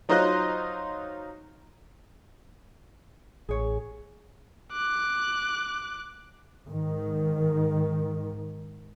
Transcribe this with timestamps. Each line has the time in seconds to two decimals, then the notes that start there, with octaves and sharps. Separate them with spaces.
0.09 F#3 D#4 F4 C5 D#5 F#6
3.49 A1 G#4 C#5
4.72 D6 F#6
6.70 G#2 D#3